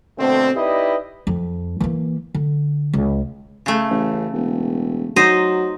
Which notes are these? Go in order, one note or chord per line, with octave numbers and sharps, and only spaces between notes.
B2 D3 A3 C4
D#4 E4 G4 B4 D5 D#5
F2
E3 A#3
D3
C#2
C#3 A3
A1
E1
F#3 D#4 C5 D#5